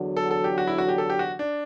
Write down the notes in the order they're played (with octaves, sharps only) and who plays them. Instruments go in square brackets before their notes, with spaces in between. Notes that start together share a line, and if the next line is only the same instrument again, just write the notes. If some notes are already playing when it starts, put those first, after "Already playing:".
Already playing: [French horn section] E2 D3 F#3
[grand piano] A4
A4
G4
F#4
E4
F#4
G4
A4
G4
F#4
D4